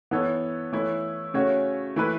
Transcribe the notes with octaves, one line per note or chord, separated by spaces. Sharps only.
E3 B3 A4 C#5
E3 A3 E4 C#5
C#3 A3 C#4 F#4 C#5
E3 A3 E4 B4